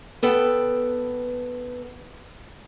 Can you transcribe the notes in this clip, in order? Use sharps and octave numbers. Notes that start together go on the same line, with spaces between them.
B3 A4 B4 G5